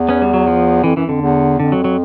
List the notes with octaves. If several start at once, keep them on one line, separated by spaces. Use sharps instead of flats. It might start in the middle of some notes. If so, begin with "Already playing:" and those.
Already playing: E2
B3 C#4
G3
F#3
F3
F2 E3
F#2 E3
F2 D3
E2
F2 D3
F#3
F#3